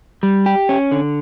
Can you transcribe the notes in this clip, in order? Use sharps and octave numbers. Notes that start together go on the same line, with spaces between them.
G3
G4
C#4
D3